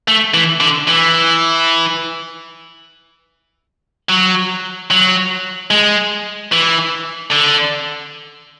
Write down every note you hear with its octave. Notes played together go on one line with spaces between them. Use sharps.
A3
E3
D3
E3
F#3
F#3
G#3
E3
D3